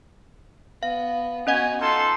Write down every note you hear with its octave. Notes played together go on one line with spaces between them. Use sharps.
B3 F5
B3 C#4 F#4 D#5 F#5 G#5
D#4 F4 A4 C6